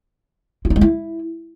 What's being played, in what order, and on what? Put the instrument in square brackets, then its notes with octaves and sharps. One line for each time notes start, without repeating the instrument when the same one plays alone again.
[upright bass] F4
D#4
G#3
E4